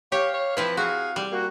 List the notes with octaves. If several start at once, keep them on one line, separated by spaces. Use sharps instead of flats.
G4 C#5 F5
C#5
F3 C4 E4 B4
F#4 G#4 F5
G3
A#3 F#4